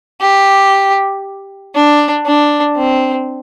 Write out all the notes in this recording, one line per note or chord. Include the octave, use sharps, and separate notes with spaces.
G4
D4
D4
C4